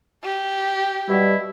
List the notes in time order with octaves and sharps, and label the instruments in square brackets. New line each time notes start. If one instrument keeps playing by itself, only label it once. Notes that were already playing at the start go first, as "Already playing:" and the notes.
[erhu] G4
[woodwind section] B2 E4 [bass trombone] G3